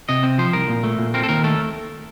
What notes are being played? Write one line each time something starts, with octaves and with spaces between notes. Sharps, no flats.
C3 D#5
C4
F3 C5
C2 A#4
A#2
A3
A#2
C4 A#4
A4
D#2 A#4
A3 A4